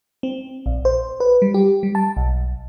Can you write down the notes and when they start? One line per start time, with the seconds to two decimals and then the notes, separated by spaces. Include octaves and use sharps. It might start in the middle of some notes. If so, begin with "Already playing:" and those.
0.23 C4
0.66 A#1
0.85 C5
1.20 B4
1.42 G3
1.54 G4
1.83 G3
1.95 A5
2.17 B1